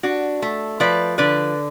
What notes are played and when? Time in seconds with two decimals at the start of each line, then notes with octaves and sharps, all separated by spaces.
0.03 D4 F#4
0.42 A3
0.80 F3 B4 D5
1.18 D3 B4 D5